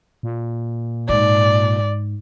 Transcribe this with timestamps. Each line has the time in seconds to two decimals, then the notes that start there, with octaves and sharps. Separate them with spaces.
0.23 A#2
1.09 G#2 D5